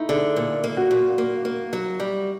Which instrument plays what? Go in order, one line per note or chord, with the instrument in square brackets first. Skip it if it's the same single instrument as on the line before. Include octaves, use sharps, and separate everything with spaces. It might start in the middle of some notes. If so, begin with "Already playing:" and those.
Already playing: [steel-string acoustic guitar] A3 [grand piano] D#4 E4
[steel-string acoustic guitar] D3 [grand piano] G#4
[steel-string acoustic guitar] A#2
A#3
[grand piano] F#4
[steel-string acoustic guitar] A#2
A#3
A#3
F#3
G3